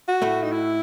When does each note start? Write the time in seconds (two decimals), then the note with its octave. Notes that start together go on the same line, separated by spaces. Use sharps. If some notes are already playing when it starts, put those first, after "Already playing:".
0.08 F#4
0.22 A2 A3
0.43 D#4
0.52 E4